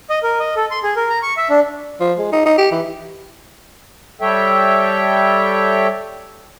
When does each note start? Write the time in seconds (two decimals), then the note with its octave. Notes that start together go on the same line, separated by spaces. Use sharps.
0.10 D#5
0.23 A#4
0.40 D#5
0.56 A4
0.71 C6
0.83 G#4
0.96 A#4
1.10 A#5
1.23 C#6
1.37 E5
1.50 D4
2.00 F3
2.18 G#3
2.32 D#4
2.45 D#4
2.58 G4
2.72 E3
4.21 G3 A4 C#5 E5 G5